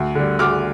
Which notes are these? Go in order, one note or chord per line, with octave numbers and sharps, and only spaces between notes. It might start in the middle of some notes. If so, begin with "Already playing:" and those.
Already playing: D2
D3 G3
D2 D6 F6